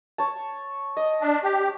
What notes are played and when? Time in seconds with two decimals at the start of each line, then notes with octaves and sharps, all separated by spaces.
0.18 C#5 A5
0.97 D#5
1.21 D4
1.44 G4